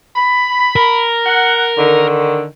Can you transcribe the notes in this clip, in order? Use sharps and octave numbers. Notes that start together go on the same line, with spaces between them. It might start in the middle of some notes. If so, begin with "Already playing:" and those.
B5
A#4
F#5
D3 D#3